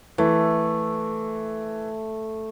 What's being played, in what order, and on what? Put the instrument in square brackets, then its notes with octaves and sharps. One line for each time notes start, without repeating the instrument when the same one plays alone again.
[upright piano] E3 [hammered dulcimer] A3